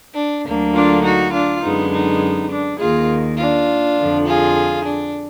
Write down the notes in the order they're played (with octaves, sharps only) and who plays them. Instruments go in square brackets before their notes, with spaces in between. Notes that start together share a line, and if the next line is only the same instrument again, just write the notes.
[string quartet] D4
D2 D3 F#3 A#3
D4 F4
D#4 F#4
D4 F4
F#2 D3 G#3 B3 D#4
D#4
D4
D#2 D#3 A#3 F4 G#4
D4 F4
F2 D3 F3
F4 G#4
D4